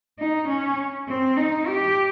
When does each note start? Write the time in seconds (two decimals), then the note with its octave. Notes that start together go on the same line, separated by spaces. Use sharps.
0.19 D#4
0.49 C#4
1.08 C4
1.37 D#4
1.67 G4